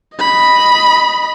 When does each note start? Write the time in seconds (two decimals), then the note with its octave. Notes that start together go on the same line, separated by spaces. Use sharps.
0.17 D#5 B5